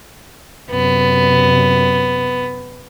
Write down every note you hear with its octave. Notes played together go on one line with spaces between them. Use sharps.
F#2 C3 B3